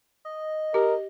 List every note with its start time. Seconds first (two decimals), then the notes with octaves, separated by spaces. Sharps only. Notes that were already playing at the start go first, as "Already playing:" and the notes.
0.25 D#5
0.74 G4 A#4